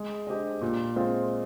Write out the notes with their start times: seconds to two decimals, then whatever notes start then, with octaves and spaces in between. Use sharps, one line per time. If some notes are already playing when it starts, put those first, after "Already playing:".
Already playing: G#3
0.27 D4 G4 C5 D#5
0.62 A#2
0.96 G#3 C4 F4